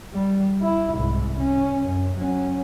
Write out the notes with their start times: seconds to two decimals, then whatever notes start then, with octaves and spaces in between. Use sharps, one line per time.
0.14 G3
0.62 E4
0.95 C2 G#2
1.39 C#4
1.82 F#2
2.18 F#3 C#4